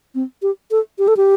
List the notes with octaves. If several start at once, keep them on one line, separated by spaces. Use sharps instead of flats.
C4
G4
A4
G4
A4
G4